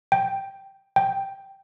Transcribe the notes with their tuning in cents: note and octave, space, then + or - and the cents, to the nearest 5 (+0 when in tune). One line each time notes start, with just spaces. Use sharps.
G5 -5
G5 -5